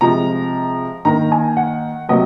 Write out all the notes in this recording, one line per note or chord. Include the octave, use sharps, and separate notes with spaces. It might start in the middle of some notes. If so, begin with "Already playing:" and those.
C3 F3 G#3 A#5
D#3 A#3 A#5
G#5
F#5
C3 F#3 A#3 D#5